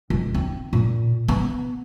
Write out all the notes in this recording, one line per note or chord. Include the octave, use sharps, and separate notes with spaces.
D#1
C4
A#2
B3